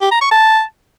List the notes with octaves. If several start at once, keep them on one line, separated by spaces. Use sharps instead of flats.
G4
A#5
C#6
A5